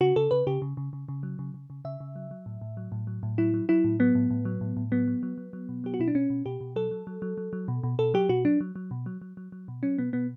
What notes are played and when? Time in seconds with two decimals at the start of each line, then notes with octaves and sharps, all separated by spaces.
0.01 C#3 F#4
0.16 C#3 A4
0.31 C#3 B4
0.47 C#3 G4
0.62 C#3
0.77 C#3
0.93 C#3
1.08 C#3
1.23 F#3
1.39 C#3
1.54 C#3
1.70 C#3
1.85 C#3 E5
2.00 C#3
2.16 F#3
2.31 F#3
2.46 A2
2.61 A2
2.77 F#3
2.92 A2
3.07 F#3
3.23 A2
3.38 F#3 E4
3.54 F#3
3.69 F#3 E4
3.84 A2
4.00 F#3 B3
4.15 A2
4.30 A2
4.45 F#3
4.61 A2
4.77 A2
4.92 F#3 B3
5.07 F#3
5.23 F#3
5.38 F#3
5.53 F#3
5.69 B2
5.84 F#3 G4
5.94 F#4
5.99 B2 E4
6.08 D4
6.15 B2 C#4
6.30 B2
6.46 B2 G4
6.61 B2
6.76 F#3 A4
6.91 F#3
7.07 F#3
7.22 F#3
7.37 F#3
7.53 F#3
7.68 B2
7.83 B2
7.99 B2 A4
8.14 F#3 G4
8.29 B2 F#4
8.45 F#3 D4
8.61 F#3
8.76 F#3
8.91 B2
9.06 F#3
9.21 F#3
9.37 F#3
9.52 F#3
9.68 B2
9.83 F#3 C#4
9.98 B2 B3
10.13 B2 B3